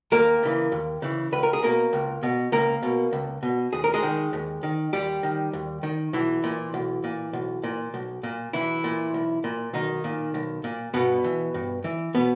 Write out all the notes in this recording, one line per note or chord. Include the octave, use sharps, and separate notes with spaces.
D#2 A#3 A#4
C#3 E3
D#2
C#3 E3
C#2 B4
A#4
G#4
B2 A#3 A#4
C#2
B2
C#2 A#3 A#4
B2
C#2
B2
D#2 G#4
A#4
G#3 G#4
D#3
D#2
D#3
D#2 G3 G4
D#3
D#2
D#3
B1 E3 E4
A#2
B1
A#2
B1
A#2
B1
A#2
B1 E3 E4
A#2
B1
A#2
B1 D#3 D#4
A#2
B1
A#2
G2 B2 B3
E3
G2
E3
B2 B3